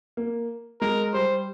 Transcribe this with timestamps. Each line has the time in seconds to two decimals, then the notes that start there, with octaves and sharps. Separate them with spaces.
0.17 A#3
0.81 G#3 A#4
1.13 G3 C5